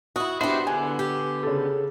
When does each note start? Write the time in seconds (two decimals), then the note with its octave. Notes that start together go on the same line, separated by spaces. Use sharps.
0.16 E4 F#4 D#6
0.41 B3 D4 E4 F#4 G4 C5
0.67 E2 D3 B3 G#5
0.99 G4
1.43 C#3 A4